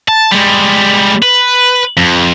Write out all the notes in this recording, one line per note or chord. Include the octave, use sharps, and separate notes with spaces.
A5
G3 G#3
B4
F2